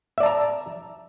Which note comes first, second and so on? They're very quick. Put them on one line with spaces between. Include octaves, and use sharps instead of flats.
E5 D5 A5 A#5